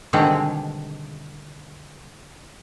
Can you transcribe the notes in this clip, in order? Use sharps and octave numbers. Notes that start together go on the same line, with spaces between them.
B2 D3 D#3 G3 G#3 C4